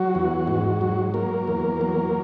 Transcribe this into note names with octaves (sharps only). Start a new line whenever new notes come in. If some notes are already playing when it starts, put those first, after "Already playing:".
Already playing: F#3 F#4
E2
G#2
F#3
F#3 A#3 A#4
E2
F#3